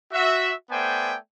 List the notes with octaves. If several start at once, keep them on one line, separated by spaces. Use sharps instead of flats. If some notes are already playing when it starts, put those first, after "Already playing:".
F#4 E5
A3 B3 C5 D5 G5 G#5